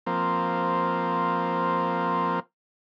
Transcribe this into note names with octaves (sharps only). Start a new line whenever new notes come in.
F3 A#3 C4